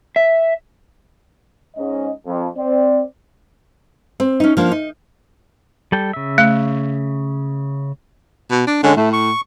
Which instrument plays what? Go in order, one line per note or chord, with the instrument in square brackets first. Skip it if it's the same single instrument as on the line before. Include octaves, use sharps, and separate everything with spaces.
[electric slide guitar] E5
[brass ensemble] G#2 C#4 D#5
F2
C4 D5
[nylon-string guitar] C4
C#4 D#4
F3 A#3 D4
D#4
[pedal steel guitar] G3 A4 G5
C#3 E5
[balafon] A3
[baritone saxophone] B2
D4
[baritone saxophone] D3 [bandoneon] G#3 C#4
[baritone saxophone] A2 [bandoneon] A3
[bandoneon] C#6